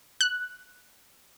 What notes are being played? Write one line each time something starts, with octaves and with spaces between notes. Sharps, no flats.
F#6